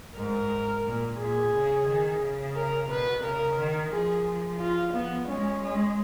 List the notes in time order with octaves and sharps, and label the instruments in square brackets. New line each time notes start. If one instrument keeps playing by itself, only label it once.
[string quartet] G#2 [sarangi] A#4
[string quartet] A#2
[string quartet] A#2 [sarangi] G#4
[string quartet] C#3
D#3
C#3
[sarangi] A#4
[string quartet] B2 [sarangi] B4
[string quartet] C#3 [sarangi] A#4
[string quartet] D#3
[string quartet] F3 [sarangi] G#4
[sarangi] F4
[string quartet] F3 [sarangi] B3
[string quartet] G#3 [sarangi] C#4
[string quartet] G#3